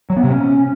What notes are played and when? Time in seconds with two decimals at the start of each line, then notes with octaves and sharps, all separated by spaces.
0.10 F#3
0.17 B3
0.23 C3
0.30 C#4